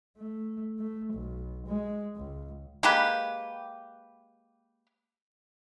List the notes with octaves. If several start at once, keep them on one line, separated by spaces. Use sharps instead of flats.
A3
A3
B1
G#3
C#2
G#3 A#3 G4 B4